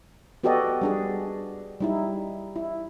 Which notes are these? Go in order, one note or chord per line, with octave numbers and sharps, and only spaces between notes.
B3 F#4 G4 A4 D5 D#5
G3 D4 G#4
G3 D#4 E4
E4